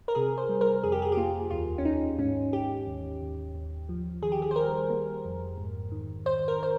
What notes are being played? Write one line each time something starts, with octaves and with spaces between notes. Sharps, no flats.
A#4
C3 G#4
C5
G3
A#4
F2 G#4
G4
G#4
G4
A#3 F4
D#2 F4
C#4
D#2 D#4
G#2 C#4
G#2 G4
D#2
D#2
D#2
F3
D#3 G#4
G4
G#4
C5
G3 A#4
A#3
F2
G#2
D#3
D#3 C5
A#4
C5